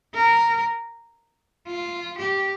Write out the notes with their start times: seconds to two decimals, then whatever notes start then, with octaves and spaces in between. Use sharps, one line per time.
0.15 A#4
1.67 F4
2.19 G4